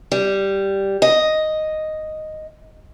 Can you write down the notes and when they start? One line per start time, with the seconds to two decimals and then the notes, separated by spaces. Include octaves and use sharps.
0.12 G3
1.02 D#5